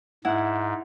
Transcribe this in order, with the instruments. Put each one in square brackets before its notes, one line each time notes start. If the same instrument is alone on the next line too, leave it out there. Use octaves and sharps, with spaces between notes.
[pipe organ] G#2 [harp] E4 F#5